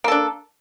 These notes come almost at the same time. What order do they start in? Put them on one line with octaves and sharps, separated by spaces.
A#3 A4 D4